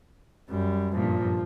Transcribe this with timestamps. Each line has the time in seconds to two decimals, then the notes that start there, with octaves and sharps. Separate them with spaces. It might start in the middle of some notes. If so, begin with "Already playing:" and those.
0.50 F#2 G3
0.95 G2 A#2 F3